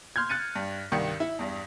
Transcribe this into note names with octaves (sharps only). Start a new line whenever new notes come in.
C6 F6 G6 G#6
F#6 A6 C#7 D#7
G2
C2 G2 D#3 C#7
E4
E2 G2